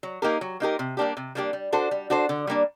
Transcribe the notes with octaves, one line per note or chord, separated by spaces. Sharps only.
F#3
A#3 D#4 G4 A#4
F#3
A#3 D#4 G4 A#4
C3
G3 A#3 D4 G4
C3
G3 A#3 D4 G4
G3
D4 F#4 A4 C5
G3
D4 F#4 A4 C5
D3
G3 A#3 D4